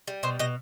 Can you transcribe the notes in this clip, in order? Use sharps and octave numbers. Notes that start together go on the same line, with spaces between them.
G3
B2 C5
B2 D#5